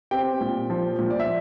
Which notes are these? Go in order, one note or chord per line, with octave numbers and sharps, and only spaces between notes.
C4 G4 G5
A#2
F3
A#2
D5
E5